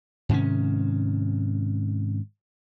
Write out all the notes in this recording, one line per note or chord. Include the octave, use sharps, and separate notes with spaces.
G#2 C3 D#3 C#4